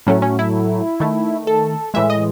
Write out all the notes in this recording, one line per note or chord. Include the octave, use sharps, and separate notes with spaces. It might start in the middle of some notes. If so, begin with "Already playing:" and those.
A2 F#3 A3 C#4
C#4
E4
D#3 A3
A4
A2 E3 G#3 E5
D#5